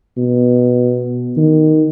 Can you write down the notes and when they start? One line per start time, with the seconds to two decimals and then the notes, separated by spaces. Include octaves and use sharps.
0.17 B2
1.37 D#3